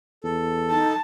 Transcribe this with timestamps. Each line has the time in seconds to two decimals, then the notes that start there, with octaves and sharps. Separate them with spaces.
0.24 E2 A4
0.70 D#4 A5